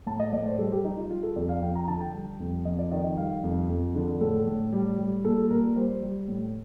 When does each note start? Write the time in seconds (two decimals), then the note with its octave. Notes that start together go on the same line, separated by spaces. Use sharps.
0.06 A2 A5
0.20 D#5
0.33 A2 D5
0.46 C5
0.59 G3 A4
0.72 G4
0.84 G3 D#4
0.97 F4
1.10 G3 F4
1.23 A4
1.36 F2 D5
1.49 F5
1.62 F2 G5
1.75 A#5
1.88 D3 A5
2.01 G5
2.14 G3
2.40 F2
2.65 F2 D#5
2.79 D5
2.92 D#3 D#5
3.04 D#5
3.17 G3 F5
3.43 F2
3.69 F2
3.95 D3
4.21 A2 A4
4.47 A2
4.73 G3
4.98 G3
5.24 A#2 A4
5.50 A#2 A#4
5.76 G3 C5
6.02 G3
6.28 A2